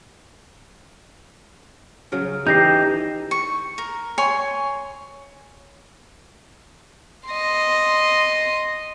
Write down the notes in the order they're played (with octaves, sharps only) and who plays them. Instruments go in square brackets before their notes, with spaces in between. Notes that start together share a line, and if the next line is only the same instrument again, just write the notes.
[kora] C#3 F#3 A#4
[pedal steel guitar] E3 D#4 [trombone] G4 [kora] A4 D5 [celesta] G6 A#6 C7
[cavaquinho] C#6
A#4
C#5 G#5 C6
[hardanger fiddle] D#5 C6